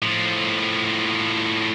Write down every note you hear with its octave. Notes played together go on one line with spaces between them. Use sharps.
A2 F3